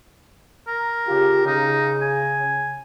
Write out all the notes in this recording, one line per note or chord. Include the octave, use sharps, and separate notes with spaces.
A#4
C#3 F4 G4
C#3 D#4
G#5